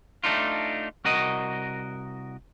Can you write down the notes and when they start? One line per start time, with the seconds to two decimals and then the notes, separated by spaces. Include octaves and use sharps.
0.24 A3 D4 D#4 F4
1.05 C2 F#4 A#4 D#5